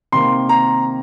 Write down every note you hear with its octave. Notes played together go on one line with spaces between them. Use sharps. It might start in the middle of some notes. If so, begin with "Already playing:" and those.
C3 D#3 A#3 C6
A#5